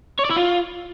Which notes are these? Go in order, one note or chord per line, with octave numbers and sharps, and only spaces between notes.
C#5
D5
E4
F4